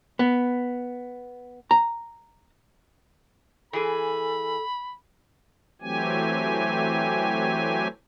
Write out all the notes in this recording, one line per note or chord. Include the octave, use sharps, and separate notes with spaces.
B3
A#5
E3 G#4 A4 B5
E3 F#3 A3 C4 G4 G#5